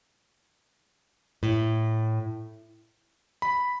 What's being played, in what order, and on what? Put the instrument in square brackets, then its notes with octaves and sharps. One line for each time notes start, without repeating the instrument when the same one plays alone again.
[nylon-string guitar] A2
[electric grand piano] B5